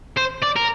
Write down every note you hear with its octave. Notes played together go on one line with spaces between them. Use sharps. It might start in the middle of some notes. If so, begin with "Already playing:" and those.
C5
D5
A#4